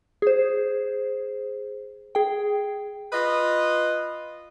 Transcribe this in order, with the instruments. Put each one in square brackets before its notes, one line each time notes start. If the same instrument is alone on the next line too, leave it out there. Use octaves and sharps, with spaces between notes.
[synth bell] G#4 C5
G#4 G5
[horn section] F4 B4 D#5